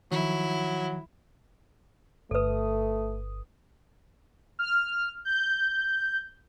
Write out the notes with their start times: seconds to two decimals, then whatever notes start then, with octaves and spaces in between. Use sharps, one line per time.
0.11 D#3 F3 F#3 E4
2.31 G1 A3 A4 B4 D#6
4.59 F6
5.25 G6